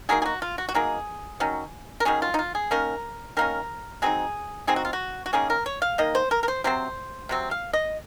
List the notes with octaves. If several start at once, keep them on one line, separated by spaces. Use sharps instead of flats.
F#3 A#3 D#4 G#4
G#4
F#4
F4
F#4
F#4
F#3 A#3 D#4 G#4
D#3 F#3 C#4
A#4
D#3 F#3 C#4 G#4
F4
D#4
F4
G#4
D#3 A#3 C#4 A#4
D#3 A#3 C#4 A#4
F#3 C4 D#4 G#4
F#3 C4 D#4 G#4
F#4
F4
F#4
F#4
D#3 A#3 C#4 G#4
A#4
C#5
F5
D#3 A#3 D#5
C5
A#4
A#4
C5
C3 F#3 C4 C5
C3 F#3 C4
F5
D#5